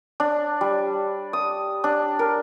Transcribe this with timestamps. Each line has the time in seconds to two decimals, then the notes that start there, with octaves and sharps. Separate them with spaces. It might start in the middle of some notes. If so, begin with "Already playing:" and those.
0.20 D4
0.61 G3
1.33 D#6
1.84 D4
2.19 A#4